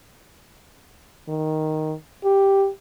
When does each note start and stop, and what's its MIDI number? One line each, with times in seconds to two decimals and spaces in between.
1.28 1.94 51
2.25 2.69 67